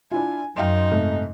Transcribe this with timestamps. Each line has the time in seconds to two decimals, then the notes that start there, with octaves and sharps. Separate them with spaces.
0.11 D4 E4 F4 G#5
0.57 F#2 D#4 F5 G5 C6
0.91 G#2 C3 A3